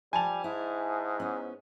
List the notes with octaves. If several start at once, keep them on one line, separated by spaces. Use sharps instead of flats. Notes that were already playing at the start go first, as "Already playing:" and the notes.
F3 G3 G#5 A5 F7
G#2 E4
B3 C#4